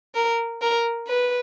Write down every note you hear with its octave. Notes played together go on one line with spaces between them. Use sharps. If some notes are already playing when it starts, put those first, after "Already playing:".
A#4
A#4
B4